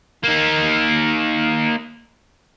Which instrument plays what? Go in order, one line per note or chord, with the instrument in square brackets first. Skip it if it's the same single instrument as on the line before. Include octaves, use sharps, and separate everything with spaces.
[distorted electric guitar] A#3 D#4